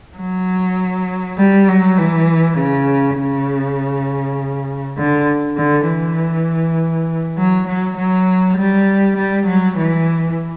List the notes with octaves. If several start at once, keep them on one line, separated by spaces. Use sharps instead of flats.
F#3
G3
F#3
E3
C#3
C#3
D3
D3
E3
F#3
F#3
F#3
G3
G3
F#3
E3